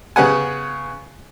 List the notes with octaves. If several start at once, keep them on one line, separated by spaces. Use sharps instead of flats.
C#3 B3 F#5 G#5